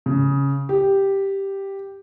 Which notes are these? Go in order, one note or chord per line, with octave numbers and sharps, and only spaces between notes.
C#3
G4